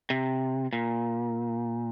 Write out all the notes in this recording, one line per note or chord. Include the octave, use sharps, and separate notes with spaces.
C3
A#2